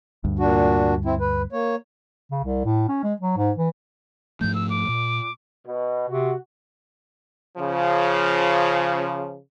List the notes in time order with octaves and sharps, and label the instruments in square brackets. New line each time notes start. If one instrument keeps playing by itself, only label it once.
[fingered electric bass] D2 G2
[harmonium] A#2 D4 F#4
C4 E4
B4
A#3 C#5
[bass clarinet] C#3
C2
A2
C#4
G#3
F#3
G#2
E3
[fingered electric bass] G#2 F3 A3 [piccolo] G6
[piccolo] E6
D6
[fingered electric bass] A#2
[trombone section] B2
[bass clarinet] C3 [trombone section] F#4
[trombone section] C#3 F3